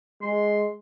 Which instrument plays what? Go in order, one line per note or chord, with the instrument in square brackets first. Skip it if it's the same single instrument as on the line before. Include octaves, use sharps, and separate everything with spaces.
[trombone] G#3 [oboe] C6